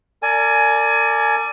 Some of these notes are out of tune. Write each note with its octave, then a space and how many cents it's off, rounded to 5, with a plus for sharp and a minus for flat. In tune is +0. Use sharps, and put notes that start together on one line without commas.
A#4 -40 D5 +0 G#5 +20